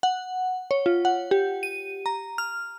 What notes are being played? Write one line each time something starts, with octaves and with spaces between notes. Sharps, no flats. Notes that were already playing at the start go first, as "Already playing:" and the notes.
F#5
C#5
F4
F#5
G4
D#7
A#5
F6